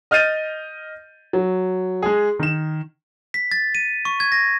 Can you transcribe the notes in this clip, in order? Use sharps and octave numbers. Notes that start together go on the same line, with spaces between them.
D#5 F6 G6 A6 D#7
F#3
G#3 G#4
D#3 E7
B6
A6
D#7
C#6
G#6
A#6